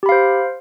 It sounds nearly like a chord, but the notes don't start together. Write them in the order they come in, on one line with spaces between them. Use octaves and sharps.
G4 B5 F5 C5